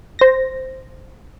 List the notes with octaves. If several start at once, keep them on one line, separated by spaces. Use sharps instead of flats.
C5 A#6